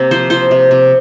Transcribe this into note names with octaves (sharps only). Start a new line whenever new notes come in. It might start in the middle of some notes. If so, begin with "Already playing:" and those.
Already playing: C3 A#3
F3 C5
F3 C5
C3
C3